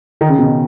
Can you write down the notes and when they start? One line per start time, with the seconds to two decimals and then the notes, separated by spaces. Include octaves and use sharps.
0.21 D#3
0.29 C#3
0.38 B2
0.46 C#3